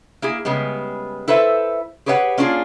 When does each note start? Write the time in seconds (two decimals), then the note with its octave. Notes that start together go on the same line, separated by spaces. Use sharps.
0.22 A#3 E4 G#4
0.45 C#3 G3 G#3 B3
1.28 E4 A4 B4 C5 E5
2.06 G4 G#4 B4 C#5 E5 F#5
2.38 A#3 C#4 D4 F4 G#4